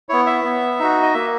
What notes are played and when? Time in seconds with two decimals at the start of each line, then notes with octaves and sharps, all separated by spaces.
0.09 B3 E4 C#5
0.27 E5
0.44 B3
0.79 D#4 F#4
1.03 D#5
1.14 A#3 E5